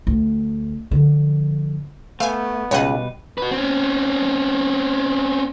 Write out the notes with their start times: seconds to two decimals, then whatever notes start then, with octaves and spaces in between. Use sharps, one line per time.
0.07 D2
0.91 D3 F3
2.20 A3 B3 F5 G#5
2.71 C#2 B2 G3 B4 C#5 F#5
3.38 F#4 B4
3.51 C4 C#4